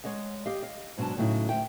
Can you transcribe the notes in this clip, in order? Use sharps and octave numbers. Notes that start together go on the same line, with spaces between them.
G#3 C#5 D#5 F#5
G4 D#5 F5
D#5 F5
G#2 B2 F#3 D4 A5
A2 C#3 F#3 D#4 E4
D2 G2 E5 G5